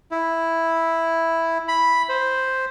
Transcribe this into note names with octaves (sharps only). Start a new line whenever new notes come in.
E4
B5
C5